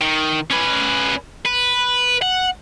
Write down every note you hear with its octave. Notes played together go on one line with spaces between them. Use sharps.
D#3
C#4 B4
B4
F#5